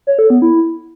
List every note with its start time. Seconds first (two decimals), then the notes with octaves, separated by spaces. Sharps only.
0.07 C#5
0.19 A4
0.30 B3
0.42 E4